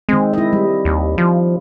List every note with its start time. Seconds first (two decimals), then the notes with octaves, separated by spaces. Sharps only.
0.09 D#3 G#3 C4
0.33 E4 D#5
0.53 G3
0.85 D#2
1.18 F3